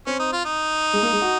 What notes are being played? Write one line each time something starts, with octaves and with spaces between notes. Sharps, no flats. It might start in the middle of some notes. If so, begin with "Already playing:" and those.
C4 C#4
D#4
F4
D#4
G#3
A#3
G#3
F#4